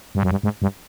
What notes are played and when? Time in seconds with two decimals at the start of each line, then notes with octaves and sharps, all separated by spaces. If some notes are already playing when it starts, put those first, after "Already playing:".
0.15 G2
0.23 F#2
0.31 G2
0.43 G#2
0.62 G2